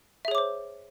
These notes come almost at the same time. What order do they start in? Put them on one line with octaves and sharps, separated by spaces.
E5 G#4 C#5 D6 C5